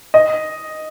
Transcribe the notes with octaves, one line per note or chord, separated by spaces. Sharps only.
D#5